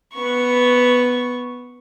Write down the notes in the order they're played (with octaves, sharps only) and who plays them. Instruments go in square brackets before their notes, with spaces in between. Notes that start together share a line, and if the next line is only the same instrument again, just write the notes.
[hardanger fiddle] B3 C#6